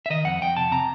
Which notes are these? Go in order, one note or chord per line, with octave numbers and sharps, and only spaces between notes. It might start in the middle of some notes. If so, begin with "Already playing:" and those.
E5
D#3 D#5
F2 F#5
F2 G5
C3 A5
C3 A#5